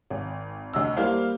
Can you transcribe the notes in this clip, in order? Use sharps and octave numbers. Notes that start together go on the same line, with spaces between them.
G#1
D2 D#5 E6
G3 A#3 E4 C5 F5